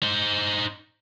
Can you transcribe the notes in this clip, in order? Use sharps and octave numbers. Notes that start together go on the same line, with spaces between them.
D#4 C5